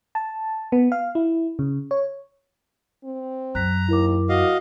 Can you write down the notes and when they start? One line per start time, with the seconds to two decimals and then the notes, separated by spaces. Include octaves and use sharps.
0.15 A5
0.72 B3
0.92 F5
1.15 E4
1.59 C#3
1.91 C#5
3.04 C4
3.55 F#2 A#5 F#6 B6
3.88 D#2 E4 A#4 D6
4.29 F#4 D#5 F5